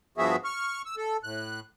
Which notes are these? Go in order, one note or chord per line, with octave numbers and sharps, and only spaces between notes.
G2 F3 B3 F#4 G#4 E5
C#6 F6
E6
A4
A2 F#6